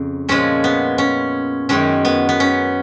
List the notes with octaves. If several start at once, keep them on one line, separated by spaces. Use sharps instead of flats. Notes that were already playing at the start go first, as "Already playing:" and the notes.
Already playing: F2 C#3
A#2 F3 G#3 C#4
B3
C#4
F#2 D#3 G#3 C#4
B3
B3
C#4